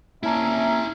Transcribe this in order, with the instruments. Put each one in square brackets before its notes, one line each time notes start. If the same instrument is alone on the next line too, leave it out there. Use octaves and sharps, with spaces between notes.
[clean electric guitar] A#3 C#5 A5 [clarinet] C#4 [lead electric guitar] E4 D5 [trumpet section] E5 A#5